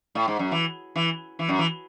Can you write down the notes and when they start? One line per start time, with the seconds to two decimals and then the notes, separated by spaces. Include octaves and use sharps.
0.15 A2
0.28 G#2
0.39 F#2
0.52 E3
0.96 E3
1.39 E3
1.49 F#2
1.59 E3